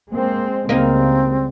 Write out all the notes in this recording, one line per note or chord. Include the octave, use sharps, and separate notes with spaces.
G#3 A#3 C4
C#2 C#3 G3 A#3 C4 D#4